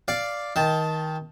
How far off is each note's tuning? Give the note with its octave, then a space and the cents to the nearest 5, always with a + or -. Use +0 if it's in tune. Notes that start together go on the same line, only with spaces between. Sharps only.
D5 +0 F5 +0
D#3 +20 A5 -5